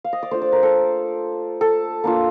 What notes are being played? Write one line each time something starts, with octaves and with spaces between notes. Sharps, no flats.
F5
D#5
D5
A3 D4 F4 C5
D5
A#4
A4
A4
A#3 D4 F4